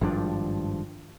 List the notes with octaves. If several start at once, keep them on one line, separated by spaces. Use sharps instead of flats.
G#1 G2 F3 D4